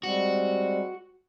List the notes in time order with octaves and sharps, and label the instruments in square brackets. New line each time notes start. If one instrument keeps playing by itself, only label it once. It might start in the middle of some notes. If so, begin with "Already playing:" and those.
[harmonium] G3 G#3 C4 [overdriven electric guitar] F#4